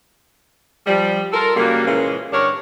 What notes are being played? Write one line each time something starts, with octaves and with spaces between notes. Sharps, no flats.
F3 G3
F4 A4 A#4
C#3 F#3 G3 A#3
A#2 C#3 E3 G#3 A#3 C#4
G2 D3 D4 A#4 C#5